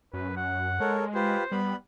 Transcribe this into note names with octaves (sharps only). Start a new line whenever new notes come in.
F#2 B4
F#5
G#3 A4 A#4 C#5
F4 G4 B4 C5
G3 B3 B4 B5